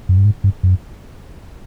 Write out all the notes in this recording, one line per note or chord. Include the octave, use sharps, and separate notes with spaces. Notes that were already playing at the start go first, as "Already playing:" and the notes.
F#2
G2
G#2
G2
F#2